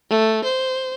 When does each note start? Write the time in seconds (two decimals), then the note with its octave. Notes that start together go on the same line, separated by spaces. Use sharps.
0.10 A3
0.44 C5